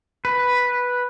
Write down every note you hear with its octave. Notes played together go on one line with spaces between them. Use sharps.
B4